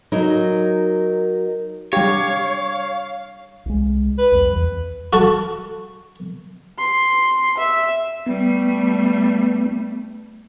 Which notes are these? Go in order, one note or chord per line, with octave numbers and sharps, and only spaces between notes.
F#3 D#4 A#4
G3 G4 C#5 F5
C2 G#3
B4
C2 F2 G3
E2
F#4 A4 A5 C#6
C6
E5
G3 A3 B3